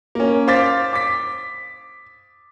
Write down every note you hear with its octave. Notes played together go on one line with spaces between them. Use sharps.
A#3 C#4
C5 F5 D6 A6 B6
D6 B6